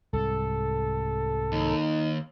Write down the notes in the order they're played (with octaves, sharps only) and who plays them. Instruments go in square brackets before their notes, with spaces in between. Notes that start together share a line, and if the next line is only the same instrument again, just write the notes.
[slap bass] C2 G#2 [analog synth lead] A4
[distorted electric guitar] D#2 [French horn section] D#4